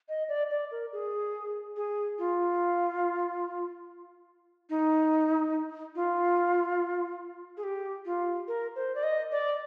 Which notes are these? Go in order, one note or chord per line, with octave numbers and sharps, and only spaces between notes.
D#5
D5
D5
A#4
G#4
G#4
F4
D#4
F4
G#4
G4
F4
A#4
C5
D5
D#5
D5